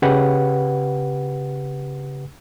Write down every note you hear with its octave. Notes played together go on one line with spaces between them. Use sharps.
C#3 G4 B4 F#5